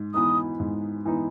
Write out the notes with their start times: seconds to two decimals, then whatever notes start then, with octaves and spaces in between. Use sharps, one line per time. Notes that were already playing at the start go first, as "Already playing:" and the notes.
Already playing: G#2
0.14 E3 B3 D#4 D#6
0.60 G#2
1.05 E3 B3 D#4